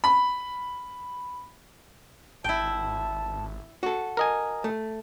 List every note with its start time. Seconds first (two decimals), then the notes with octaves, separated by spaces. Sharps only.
0.04 B5
2.44 G#1 E4 G5 A5
3.83 F#4 A4
4.17 A#4 D#5 G#5
4.64 A3